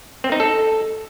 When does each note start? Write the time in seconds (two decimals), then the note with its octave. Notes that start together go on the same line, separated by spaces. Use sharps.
0.24 C4
0.32 D#4
0.40 A4